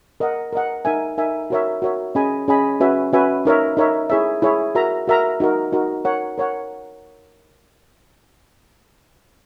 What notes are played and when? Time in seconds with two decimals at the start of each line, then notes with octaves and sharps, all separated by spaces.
0.20 A#4 D#5 F#5
0.53 A#4 D#5 F#5
0.85 D#4 A#4 E5 G#5
1.18 D#4 A#4 E5 G#5
1.50 F#4 A#4 C#5 E5
1.82 F#4 A#4 C#5 E5
2.15 C#4 G#4 D#5 G#5 B5
2.48 C#4 G#4 D#5 G#5 B5
2.80 C#4 F#4 B4 E5 G#5
3.13 C#4 F#4 B4 E5 G#5
3.45 D#4 A#4 C#5 E5
3.77 D#4 A#4 C#5 E5
4.10 E4 G#4 C#5 E5
4.42 E4 G#4 C#5 E5
4.75 F#4 A#4 E5 A#5
5.07 F#4 A#4 E5 A#5
5.40 D#4 F#4 A#4
5.72 D#4 F#4 A#4
6.05 A#4 C#5 F#5
6.38 A#4 C#5 F#5